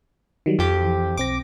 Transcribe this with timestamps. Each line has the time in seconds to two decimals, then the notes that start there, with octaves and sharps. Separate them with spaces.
0.46 D#3 F#3 G3
0.59 F2 F3 G4
0.84 E3
1.17 B1 C4 D6 A#6